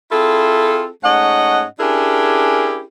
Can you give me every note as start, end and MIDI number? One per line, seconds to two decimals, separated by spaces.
0.12 0.88 60
0.12 0.88 64
0.12 0.88 65
0.12 0.88 68
0.12 0.88 69
1.04 1.64 44
1.04 1.64 57
1.04 1.64 61
1.04 1.64 75
1.04 1.64 78
1.80 2.83 61
1.80 2.83 62
1.80 2.83 64
1.80 2.83 67
1.80 2.83 68
1.80 2.83 70